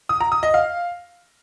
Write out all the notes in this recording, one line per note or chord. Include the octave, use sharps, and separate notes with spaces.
D#6
A#5
D#6
D#5
F5